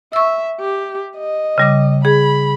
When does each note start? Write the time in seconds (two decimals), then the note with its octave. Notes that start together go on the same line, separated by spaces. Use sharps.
0.13 E5 C#6 E6
0.60 G4
1.18 D#5
1.58 C#3 G3 D6
2.05 G#4 B5